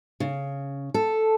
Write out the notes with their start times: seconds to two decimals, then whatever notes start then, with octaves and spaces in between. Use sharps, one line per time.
0.20 C#3
0.94 A4